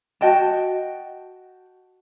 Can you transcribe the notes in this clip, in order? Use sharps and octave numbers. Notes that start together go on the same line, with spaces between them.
F#4 D#5 G5 A5